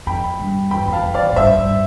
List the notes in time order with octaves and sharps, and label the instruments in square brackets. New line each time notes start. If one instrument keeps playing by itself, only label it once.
[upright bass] F2 [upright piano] G5 B5
[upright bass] G2
[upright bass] E2 [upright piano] G5 B5
[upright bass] E2
[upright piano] F5 A5
[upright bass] F2
[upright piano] D5 F5
[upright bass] E2
A2
[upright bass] G2 [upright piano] C5 E5
[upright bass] G2